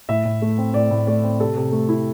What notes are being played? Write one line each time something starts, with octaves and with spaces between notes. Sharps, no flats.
A2 E5
A2
A3
C4
A2 D5
A2
A3 D5
C4
C3 A4
C3
A3
E4